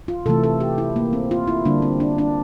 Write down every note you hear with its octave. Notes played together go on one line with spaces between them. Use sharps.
F4
C3 E3 A3 A4
A4
G4
E4
A#3
C4
F4
E4
D3 G3 A#3 D4
C4
D4
D4